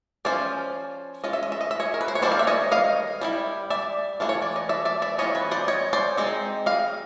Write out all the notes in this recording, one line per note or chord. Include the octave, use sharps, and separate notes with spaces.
F3 A#3 C#4 F4 C5 D5
G#3 C#4 F4 D#5
E5
D#5
E5
D#5
E5
C#5 D#5
A#4
B4
C5
C#5
D#3 G3 A#3 D4 C5 D5
F5
E5
C#5 D#5
D#5 F5
G3 C4 E4
D5 E5
E3 A3 D4 F4
C#5
D5
D#5
D5 E5
D5 E5
D5 E5
E3 G3 C4 F4 C#5 D#5
B4 C#5
C5 D5
C#5 D#5
C5 D5
G#3 C4 D#4
D#5 F5